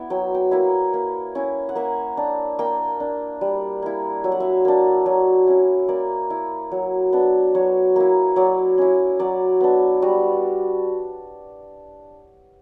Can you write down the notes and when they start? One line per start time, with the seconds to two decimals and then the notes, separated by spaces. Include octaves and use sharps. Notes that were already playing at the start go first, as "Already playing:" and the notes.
Already playing: B3 E4 D5 E5
0.10 F#3 G5
0.35 G5
0.51 A#3 E4
0.94 A#3
1.35 C#4 E4
1.69 F#5
1.75 A#3 E5
2.17 D4
2.59 A#3 G5
3.00 D4
3.41 G3
3.82 A#3 E4
4.24 F#3 E5
4.32 F#5
4.40 E5
4.65 A#3 D4
5.06 F#3
5.47 C#4 E4
5.89 A#3 D5
6.30 E4
6.71 F#3
7.13 B3 D4
7.55 F#3 C#5
7.96 A#3 E4
8.36 F#3 D5
8.78 C#4 E4
9.19 F#3 D5
9.61 B3 D4
10.02 G3 F#4